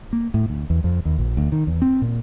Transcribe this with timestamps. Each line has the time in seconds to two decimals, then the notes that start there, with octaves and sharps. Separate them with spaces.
0.13 A#3
0.34 A2
0.50 D2
0.70 E2
0.84 F2
1.05 D#2
1.19 A#1
1.37 D2
1.52 D#3
1.67 E2
1.82 C4
2.02 A#2